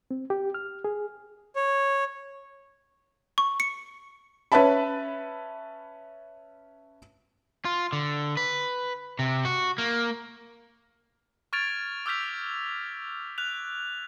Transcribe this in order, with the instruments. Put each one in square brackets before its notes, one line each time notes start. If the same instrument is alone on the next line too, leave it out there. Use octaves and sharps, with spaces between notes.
[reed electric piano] C4
G4
F6
G#4
[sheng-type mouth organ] C#5
[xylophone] C#6
C#7
[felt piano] C#4 B4 C#5 E5 A5 B5
[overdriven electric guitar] F4
D3
B4
C3
F#4
A#3
[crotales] C#6 F6 G#6 A6 D7 F7
D6 E6 F6 G6 B6 F7
F6 F#6 F7